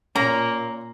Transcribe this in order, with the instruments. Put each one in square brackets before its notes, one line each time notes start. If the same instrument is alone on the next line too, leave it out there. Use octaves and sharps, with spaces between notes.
[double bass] A#2 [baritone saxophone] A#3 [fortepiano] C#4 [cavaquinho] A#5